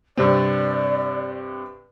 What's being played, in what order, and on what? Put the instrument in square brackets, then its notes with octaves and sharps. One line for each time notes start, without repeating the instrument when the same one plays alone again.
[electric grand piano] G2 C3 C4 [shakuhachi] D5